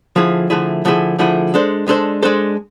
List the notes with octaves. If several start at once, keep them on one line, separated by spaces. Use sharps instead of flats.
D3 F3 A3 E4 G#4
D3 F3 A3 E4 G#4
D3 F3 A3 E4 G#4
D3 F3 A3 E4 G#4
G#3 D4 A4 C5
G#3 D4 A4 C5
G#3 D4 A4 C5